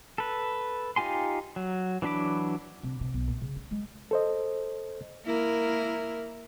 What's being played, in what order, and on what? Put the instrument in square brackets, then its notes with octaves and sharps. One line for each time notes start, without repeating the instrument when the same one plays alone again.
[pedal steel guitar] A4 B4
D#4 F4 G4 G#5 C6
F#3
E3 F#3 D4 B5 D6
[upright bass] C3
C3
B1
A#2
C#3
C#4
G#3
[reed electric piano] A4 C5 D#5
[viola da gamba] A#3 E4 A#4